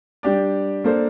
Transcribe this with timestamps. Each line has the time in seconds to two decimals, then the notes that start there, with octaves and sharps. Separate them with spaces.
0.23 G3 D4 G4 D5
0.84 A#3 D4 A4 C5